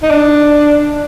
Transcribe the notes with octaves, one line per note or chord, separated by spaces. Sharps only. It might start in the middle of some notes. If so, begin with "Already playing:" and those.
D#4
D4